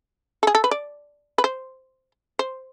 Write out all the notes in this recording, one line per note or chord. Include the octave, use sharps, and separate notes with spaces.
A4
G#4
A4
B4
D5
B4
C5
C5